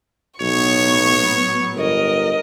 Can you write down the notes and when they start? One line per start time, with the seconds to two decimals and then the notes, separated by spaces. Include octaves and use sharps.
0.41 B1 A2 F#3 B3 C#5 C#6
1.76 G1 A#4 D#5